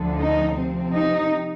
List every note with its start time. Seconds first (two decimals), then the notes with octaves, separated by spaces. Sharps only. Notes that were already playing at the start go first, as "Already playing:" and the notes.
Already playing: D2 D3 F3
0.19 D#4
0.56 C3 F3 C4
0.93 D#4